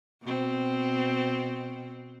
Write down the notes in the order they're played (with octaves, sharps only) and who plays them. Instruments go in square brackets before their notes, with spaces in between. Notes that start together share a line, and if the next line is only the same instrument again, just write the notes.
[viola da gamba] B2 C4